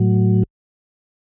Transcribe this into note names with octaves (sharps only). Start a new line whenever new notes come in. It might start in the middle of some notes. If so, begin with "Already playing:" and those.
Already playing: A2 F#3